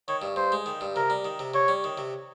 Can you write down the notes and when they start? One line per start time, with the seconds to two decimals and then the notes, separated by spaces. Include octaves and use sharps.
0.08 D#3 C#5
0.22 G2
0.36 G2 C5
0.52 G#3
0.66 D#3
0.81 G2
0.96 C3 A#4
1.10 G3
1.25 D#3
1.39 C3
1.54 C3 C#5
1.68 G3
1.84 D#3
1.98 C3